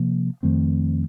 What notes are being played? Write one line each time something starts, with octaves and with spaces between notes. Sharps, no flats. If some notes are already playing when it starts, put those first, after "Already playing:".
Already playing: C3 F3 A#3
F2 D#3 A3 C4